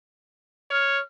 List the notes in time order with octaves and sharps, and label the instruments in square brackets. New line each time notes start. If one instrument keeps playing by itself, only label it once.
[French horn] C#5 [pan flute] F6